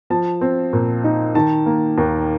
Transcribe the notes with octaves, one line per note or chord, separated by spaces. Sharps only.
F3 A5
C4
A#2
D#4
D#3 A5
A#3
D#2